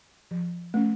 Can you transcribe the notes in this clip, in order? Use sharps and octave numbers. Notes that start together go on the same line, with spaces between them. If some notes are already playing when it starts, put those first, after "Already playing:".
F3
A3 C#4